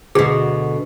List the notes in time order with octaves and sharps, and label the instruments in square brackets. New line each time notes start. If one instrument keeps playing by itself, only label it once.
[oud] D2 B2 [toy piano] G#4